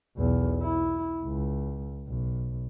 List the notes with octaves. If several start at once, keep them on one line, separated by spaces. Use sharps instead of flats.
B1 E2
E4
C#2
B1